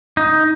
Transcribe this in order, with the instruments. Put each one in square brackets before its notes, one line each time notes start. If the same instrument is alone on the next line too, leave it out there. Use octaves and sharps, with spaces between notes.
[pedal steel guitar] D#4